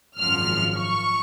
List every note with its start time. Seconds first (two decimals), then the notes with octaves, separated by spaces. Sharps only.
0.18 G#1 F#2 F3 F6
0.78 C#6